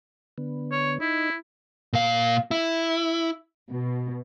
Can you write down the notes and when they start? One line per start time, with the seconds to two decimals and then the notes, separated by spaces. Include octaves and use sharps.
0.38 D3 B3
0.72 C#5
1.00 D#4 E4
1.93 A#2 F5
2.51 E4
3.73 B2